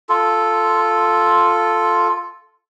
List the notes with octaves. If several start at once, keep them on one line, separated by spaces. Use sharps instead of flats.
F4 A4